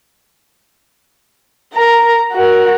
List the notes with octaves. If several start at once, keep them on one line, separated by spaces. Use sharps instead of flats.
A#4 A#5
F#4 A#4